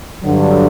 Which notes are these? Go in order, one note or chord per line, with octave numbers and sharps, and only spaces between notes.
G2 D3 F#3